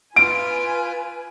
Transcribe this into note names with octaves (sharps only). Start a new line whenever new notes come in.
F4 B4 G#5 D7